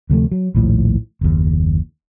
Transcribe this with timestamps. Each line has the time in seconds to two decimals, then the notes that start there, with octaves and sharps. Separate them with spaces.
0.10 D2 C3 F3 A3
0.32 F#3
0.55 A#1 D#2 A2 F3
1.21 F#1 D#2